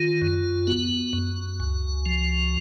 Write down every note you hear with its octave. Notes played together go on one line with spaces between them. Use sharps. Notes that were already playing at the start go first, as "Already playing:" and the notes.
Already playing: D#3 F4
F#2
B3 F#4
F#2
C#2
F3